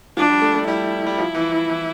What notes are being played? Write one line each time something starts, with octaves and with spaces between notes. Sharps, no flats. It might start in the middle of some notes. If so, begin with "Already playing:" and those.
F3 D4
G3
A3
A3
G3 E4
G3
F3
E3
E3
E3